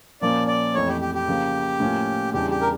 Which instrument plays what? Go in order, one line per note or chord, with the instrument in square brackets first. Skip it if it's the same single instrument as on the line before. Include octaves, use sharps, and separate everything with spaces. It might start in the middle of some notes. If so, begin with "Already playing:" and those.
[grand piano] A#2 F3 A#3 C#4 [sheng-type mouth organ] D5
[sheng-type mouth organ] D5
[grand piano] F2 E3 A3 [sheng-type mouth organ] C#5
[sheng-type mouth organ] G4
G4
G4
[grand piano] C#3 F3 A#3
A2 F3 A#3 C#4 F4
[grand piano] E2 C#3 E3 G3 D4 [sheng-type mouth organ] G4
[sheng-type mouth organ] G4
A#4